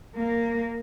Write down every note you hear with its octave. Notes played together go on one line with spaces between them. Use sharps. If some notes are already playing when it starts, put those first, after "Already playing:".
A#3